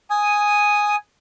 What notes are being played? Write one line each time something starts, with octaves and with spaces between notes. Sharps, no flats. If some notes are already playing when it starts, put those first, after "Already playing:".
G#5 D#6